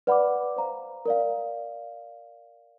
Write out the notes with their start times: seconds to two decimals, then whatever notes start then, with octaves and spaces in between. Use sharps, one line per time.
0.07 B4 D5 F#5 B5 D6
0.56 C5 F5 A#5
1.05 A#4 D5 F5